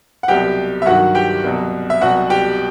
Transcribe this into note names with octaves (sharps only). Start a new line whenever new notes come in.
F#5
C2 B2 F#3 G4 G5
E5
G2 D#3 F#3 F#4 F#5
G4 G5
C2 B2 F#3
E5
C2 B2 F#3 F#4 F#5
G4 G5